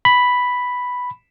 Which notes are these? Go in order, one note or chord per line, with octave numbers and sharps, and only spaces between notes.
B5